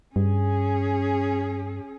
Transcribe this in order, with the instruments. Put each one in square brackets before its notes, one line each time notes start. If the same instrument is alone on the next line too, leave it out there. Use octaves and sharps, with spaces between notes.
[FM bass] G2 [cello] C#4 G#4